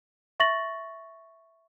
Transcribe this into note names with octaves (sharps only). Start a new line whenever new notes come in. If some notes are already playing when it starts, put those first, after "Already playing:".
E5 C#6 A6 A#6 F#7